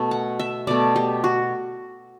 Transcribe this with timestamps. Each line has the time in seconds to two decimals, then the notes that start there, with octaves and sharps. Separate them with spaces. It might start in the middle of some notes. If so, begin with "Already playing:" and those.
Already playing: B2 A3
0.11 F#5
0.39 E5
0.67 B2 A3 D5
0.96 G4
1.24 F#4